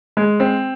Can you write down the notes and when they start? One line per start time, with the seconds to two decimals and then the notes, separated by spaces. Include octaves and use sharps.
0.17 G#3
0.40 C4